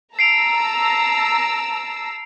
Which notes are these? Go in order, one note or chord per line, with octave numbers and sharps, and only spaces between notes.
A5 A#5 E6 C7 D7 F7